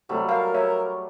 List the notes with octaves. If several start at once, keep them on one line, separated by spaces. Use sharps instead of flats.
C3 F#3 G3 A3
A#4 F5
C#5 E5